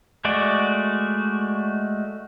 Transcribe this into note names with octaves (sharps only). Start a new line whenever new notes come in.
G#3 A3 F#4 D5